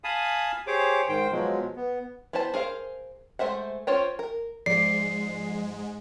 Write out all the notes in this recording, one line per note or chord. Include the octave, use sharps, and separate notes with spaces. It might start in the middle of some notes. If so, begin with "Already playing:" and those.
F5 G#5 A5 B5 D#6
G4 G#4 C5 C#5 D6
G#2 D#3 C5 G5
B2 F3 F#3 G#3
B3
B3 E4 B4 C5 A5
G#4 A#4 C5 F5
G#3 A3 C5 E5 F#5
C#4 F4 C5 C#5 G5
A#4
G#2 F3 G#3 D5 C7